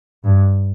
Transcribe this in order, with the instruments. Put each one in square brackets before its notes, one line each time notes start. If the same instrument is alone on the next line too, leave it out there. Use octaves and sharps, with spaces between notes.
[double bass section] G2